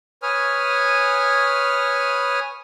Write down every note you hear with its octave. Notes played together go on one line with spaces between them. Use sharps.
B4 C#5 G#5 D#6 F6